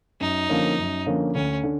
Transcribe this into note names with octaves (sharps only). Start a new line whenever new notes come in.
F#2 D#4
D3 F3 A#3 C#4
F#2
D3 F3 A#3 C#4
D2 C#4
D3